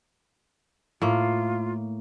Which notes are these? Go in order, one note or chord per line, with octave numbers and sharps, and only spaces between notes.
A2 A#3 F4